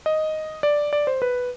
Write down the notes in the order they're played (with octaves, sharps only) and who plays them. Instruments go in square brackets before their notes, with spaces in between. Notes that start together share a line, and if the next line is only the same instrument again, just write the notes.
[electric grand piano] D#5
D5
D5
C5
B4